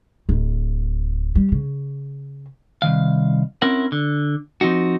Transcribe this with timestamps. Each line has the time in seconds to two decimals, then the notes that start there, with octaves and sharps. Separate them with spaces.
0.29 D1
1.35 G3
1.52 C#3
2.82 C2 G2 D#3 F5
3.62 C4 C#4 E4 A#4 F#5
3.92 D3
4.61 F3 C4 D#4 F#4